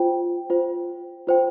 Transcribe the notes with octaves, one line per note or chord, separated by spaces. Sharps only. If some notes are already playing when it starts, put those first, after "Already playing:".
Already playing: F4 C5 G5
F4 C5 G5
F4 C5 G5